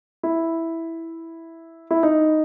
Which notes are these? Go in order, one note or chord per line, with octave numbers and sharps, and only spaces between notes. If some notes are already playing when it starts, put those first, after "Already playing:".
E4
E4
D#4